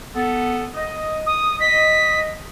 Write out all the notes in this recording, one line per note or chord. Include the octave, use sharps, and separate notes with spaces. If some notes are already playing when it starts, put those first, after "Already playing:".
B3 A4
D#5
D#6
D#5 B6